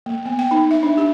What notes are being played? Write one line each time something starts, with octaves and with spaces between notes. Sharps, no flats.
A#3
B3
G5
D#4
E5
D4
G4